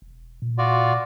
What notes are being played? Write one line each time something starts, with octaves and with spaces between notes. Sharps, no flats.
E1
A#2
F4 F#4 D5